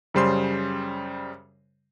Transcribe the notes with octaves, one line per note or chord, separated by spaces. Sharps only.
F#2 C#3 G3 C5 C6 C7